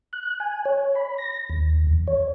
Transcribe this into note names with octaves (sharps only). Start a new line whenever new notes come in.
F#6
G#5
C#5
B5
A#6
D#2
E2
C#5